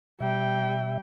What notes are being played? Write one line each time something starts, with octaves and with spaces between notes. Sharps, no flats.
B2 G3 E5 G5